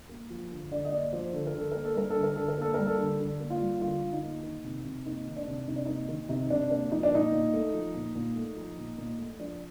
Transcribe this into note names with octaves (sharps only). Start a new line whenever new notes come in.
A#3
F3
D3
D3 D5
D#5
A#3 D5
F3 C5
D3 A4
A#4
D3 A4
A#3 A#4
A4
G3 A#4
A4
D3
A#4
D3 A4
A#4
A#3 A4
G3 A#4
A4
D3
D3
A#3
F4
G3
D3 F4
D3
D#4
A#3
D#3
C3
C3
A#3 D#4
D#3
D4
C3
C3 D#4
D4
A#3 D#4
D#3
C3 D#4
C3 D4
A#3 D4
F3 D#4
D4
A#2 D#4
A#2
A3
F3
A#2
A#2
A3
F3
A#2
A#2
A3
F3 D4